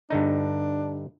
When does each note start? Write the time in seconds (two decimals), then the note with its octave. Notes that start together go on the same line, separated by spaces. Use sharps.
0.10 G2 D3 D4 D#4